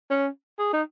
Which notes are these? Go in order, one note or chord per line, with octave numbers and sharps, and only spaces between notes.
C#4
G#4
D#4